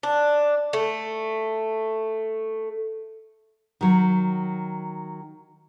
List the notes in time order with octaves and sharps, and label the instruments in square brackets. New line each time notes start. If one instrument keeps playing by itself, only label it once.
[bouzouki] D4
A3
[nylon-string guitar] D#3 F#3